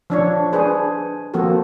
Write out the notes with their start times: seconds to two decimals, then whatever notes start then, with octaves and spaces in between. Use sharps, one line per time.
0.10 F3 D4 C#5
0.52 D4 G#4 B4 C5
1.34 F3 A#3 C4 F#4 A4